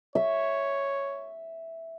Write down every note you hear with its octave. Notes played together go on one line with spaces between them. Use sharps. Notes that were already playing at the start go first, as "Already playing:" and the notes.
C#5 E5